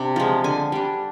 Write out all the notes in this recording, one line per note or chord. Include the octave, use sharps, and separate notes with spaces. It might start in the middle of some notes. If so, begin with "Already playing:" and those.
Already playing: C3 D4
F3 G#3
D3 G#5
G3 D4